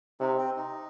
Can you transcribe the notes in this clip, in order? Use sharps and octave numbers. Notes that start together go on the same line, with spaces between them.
C3 D#4
C4
D#4